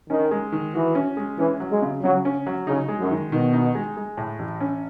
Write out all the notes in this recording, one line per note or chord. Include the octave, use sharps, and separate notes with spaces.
D#3 C#4
G#3
D#3
E3 F#4
C#4
G#3
E3 C#4
F#3
G#3
C#3
C#3 F#3
C#4
F#3
C#3 D#4
G#3
F#2
D#3
B2 D#3
D#4
G#3
G#3
A2
A1
C#4